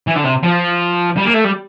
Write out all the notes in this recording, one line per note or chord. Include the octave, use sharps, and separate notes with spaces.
E3
D3
C3
F3
G3
A#3
A3
G3